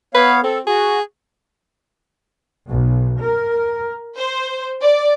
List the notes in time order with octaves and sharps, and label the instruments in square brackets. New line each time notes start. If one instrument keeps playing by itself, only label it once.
[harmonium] B3 C#5 F5 [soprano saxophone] B4
[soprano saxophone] C4 [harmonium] A4
[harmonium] F#4 [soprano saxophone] G#4
[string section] B1
A#4
C5
D5